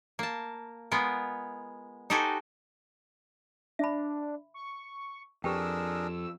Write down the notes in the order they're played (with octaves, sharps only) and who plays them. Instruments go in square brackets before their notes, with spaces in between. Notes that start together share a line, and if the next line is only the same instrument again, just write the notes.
[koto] A#3 A5
G#3 B3 F4 A#4
D#4 F#4 G4 A4 C5 G#5
[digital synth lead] D4 [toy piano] E5 B5
[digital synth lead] C#6
[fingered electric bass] F2 [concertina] D4 G#4 A#4 [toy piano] G4 B4 G5 [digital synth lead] E6